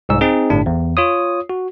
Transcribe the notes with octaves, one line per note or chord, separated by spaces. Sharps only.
C2 G#2 E6
C4 D#4 G#4
G1 A2 D4
E2
F4 C#5 D#6
F#4